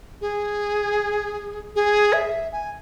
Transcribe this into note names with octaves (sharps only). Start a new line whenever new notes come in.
G#4
G#4
E5
G#5